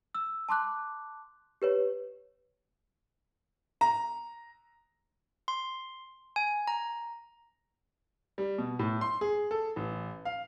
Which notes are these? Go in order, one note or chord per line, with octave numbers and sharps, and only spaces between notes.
E6
A5 C6 D6 F#6
G4 B4 C#5
A#5
C6
G#5
A#5
G3
B2
A2
C6
G#4
A4
A1
F5